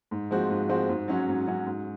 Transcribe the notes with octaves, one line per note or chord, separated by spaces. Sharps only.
G#2
F3 G#3 C4 F#4
G#2
F3 G#3 C4 F#4
G#2
F#3 C#4 F#4
G#2
F#3 C#4 F#4
G#2